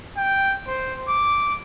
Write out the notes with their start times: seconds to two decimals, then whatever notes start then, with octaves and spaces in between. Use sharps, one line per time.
0.17 G5
0.67 C5
1.08 D6